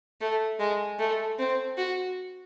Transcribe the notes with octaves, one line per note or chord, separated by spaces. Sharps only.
A3
G#3
A3
C4
F#4